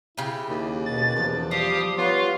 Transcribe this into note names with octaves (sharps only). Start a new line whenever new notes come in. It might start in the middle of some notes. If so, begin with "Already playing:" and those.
C#3 E4 G4
D#2
B2 A6
E2 F3
G3 G4 F5 D#6
B3 F4 C#5 F5